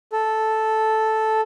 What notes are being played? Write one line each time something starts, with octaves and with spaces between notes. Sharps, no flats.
A4